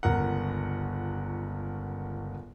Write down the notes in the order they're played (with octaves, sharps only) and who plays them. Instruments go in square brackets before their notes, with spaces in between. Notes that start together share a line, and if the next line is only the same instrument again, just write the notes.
[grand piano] G1 C#2 A#4 F#5